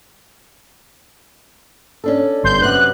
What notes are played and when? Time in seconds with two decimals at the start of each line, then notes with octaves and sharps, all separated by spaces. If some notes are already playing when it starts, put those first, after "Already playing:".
2.04 C#4 D4 A4
2.43 G1 C6 G6
2.62 F#2 C3 B4 F#6